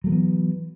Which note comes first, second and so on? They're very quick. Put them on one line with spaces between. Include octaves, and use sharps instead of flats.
F#3 A3 E3 B3